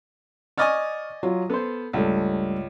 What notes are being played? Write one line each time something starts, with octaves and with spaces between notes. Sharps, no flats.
D5 D#5 G#5 C#6 F6 A6
F#3 F4
B3 A4 C5
C#2 G2 A3